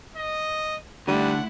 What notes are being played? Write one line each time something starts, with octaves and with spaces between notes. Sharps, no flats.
D#5
D3 G3 A3 E4 F#5